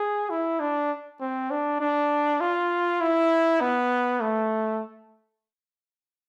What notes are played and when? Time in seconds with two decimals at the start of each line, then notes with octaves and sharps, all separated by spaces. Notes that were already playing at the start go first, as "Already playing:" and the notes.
Already playing: G#4
0.30 E4
0.60 D4
1.21 C4
1.50 D4
1.80 D4
2.40 F4
3.01 E4
3.60 B3
4.21 A3